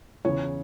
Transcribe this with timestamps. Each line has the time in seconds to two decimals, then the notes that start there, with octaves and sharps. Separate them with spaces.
0.25 E2 C#3 E3 C#5